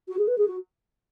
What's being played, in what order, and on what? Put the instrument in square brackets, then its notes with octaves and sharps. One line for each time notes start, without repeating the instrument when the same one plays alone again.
[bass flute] F#4
G#4
B4
G#4
F#4